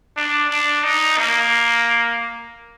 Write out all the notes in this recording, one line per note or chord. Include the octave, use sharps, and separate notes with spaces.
D4
D4
D#4
A#3